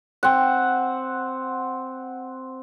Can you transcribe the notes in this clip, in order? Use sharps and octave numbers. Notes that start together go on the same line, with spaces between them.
C4 F#5